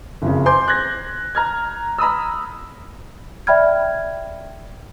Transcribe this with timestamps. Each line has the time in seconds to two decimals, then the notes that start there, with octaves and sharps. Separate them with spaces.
0.22 F#1 F2 C#3
0.45 C5 G#5 C6 D6 G6
0.68 F#6 G#6 A#6
1.35 A#5 F6 G#6
1.98 A#5 B5 D#6 E6
3.47 D5 E5 G5 B5 F6 G#6